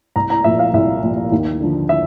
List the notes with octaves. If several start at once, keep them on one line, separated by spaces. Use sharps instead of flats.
C2 A#5
A#5
A#2 F3 E5
F5
C2 E5
A#2 F3
D#2
D3 F3
E5